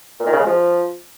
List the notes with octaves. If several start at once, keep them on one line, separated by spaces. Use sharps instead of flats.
A#2
D#3
C#3
G#3
F3